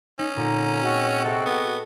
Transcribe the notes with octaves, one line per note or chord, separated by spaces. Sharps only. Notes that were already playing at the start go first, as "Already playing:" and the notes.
C#4 D#4
F2 A#2 D3 A#5
G#3 C4 F#4
C3 A4
B3